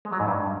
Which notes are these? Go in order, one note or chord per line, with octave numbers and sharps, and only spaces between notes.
G#3
F#3
G#2
G2